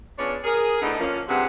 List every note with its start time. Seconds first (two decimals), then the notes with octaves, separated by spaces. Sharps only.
0.18 B3 C#4 D4 F4 G#4 C#5
0.44 G#4 A#4
0.81 A2 D3 B3 D#4
1.00 F3 A#3 C#4
1.28 G2 C3 C4 G#4 F#5